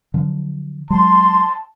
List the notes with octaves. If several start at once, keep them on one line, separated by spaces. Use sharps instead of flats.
D3 F3 F#3
F#3 G#3 A5 C6